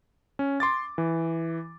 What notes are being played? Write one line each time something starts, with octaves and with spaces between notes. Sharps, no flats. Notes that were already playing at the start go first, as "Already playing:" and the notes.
C#4
C6 D6 A6
E3